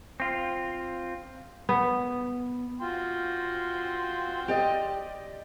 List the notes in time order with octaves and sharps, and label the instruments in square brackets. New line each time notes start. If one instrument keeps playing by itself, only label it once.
[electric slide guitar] C4 F4
[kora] B3
[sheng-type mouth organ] F4 [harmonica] F#4 G5 C6
[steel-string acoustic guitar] G4 D5 D#5